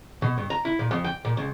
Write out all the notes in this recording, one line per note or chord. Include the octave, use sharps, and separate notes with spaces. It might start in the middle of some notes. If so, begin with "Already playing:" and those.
B2
G2
A#5
E4
A#2
F2
G5
A#2
C#2